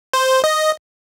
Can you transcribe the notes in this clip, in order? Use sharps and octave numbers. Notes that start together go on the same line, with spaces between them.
C5
D#5